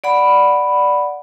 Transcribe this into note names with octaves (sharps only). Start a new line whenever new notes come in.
D5 F#5 B5